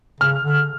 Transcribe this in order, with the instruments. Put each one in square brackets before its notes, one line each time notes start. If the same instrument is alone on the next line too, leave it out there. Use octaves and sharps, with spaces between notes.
[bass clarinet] C#3 [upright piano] F6
[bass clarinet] D3